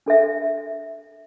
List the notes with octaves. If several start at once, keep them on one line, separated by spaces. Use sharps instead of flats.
D4 A4 E5